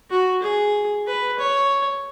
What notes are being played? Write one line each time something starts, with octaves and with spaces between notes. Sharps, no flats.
F#4
G#4
B4
C#5